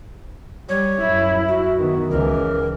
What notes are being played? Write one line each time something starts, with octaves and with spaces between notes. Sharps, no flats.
G3 C#5
F#2 E4
F#4
D#3 B3
C#2 E3 A#4